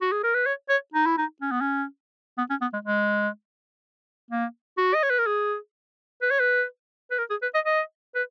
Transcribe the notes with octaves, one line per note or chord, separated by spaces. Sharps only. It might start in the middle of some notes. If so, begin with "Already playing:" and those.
F#4
G#4
A#4
B4
C#5
C#5
D#4
E4
D#4
C#4
B3
C#4
B3
C#4
B3
G#3
G#3
A#3
F#4
D#5
C#5
B4
A#4
G#4
B4
C#5
B4
B4
A#4
G#4
B4
D#5
D#5
B4